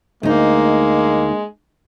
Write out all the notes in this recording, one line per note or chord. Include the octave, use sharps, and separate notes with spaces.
D2 G#3 A#3 D#4